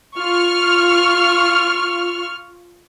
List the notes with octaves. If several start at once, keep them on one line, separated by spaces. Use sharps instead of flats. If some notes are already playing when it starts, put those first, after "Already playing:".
F4 C#6 F6